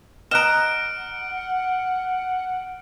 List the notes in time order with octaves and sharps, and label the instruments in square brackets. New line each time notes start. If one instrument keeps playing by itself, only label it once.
[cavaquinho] D#5 A#5 [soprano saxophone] F#5 [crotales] F6 D7 [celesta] F#6 E7